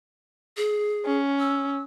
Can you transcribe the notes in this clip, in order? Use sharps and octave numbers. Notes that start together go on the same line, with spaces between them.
G#4
C#4
E6